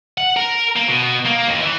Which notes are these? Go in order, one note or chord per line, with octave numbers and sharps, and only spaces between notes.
F#5
A#4
A#3
B2
A#3
D#2
E3